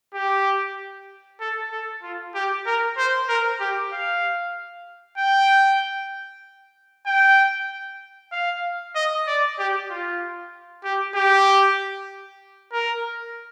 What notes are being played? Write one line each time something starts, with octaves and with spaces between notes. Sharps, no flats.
G4
A4
A4
F4
G4
A#4
C5
A#4
G4
F5
G5
G5
F5
D#5
D5
G4
F4
G4
G4
A#4